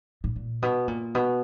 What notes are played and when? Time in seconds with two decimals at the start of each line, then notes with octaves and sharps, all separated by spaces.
0.24 A2
0.36 A#2
0.62 B2
0.88 A#2
1.15 B2